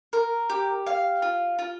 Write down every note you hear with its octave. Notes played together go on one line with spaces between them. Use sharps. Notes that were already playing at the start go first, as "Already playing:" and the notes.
A#4
G4
F5
F4
F4